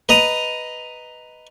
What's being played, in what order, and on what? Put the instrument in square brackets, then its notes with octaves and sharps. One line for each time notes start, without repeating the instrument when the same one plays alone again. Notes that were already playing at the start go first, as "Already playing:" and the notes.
[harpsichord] B4 D#5 A#5